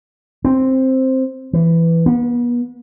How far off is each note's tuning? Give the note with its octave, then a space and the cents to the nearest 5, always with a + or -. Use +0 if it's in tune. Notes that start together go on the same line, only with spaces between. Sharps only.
C4 +5
E3 +10
B3 -40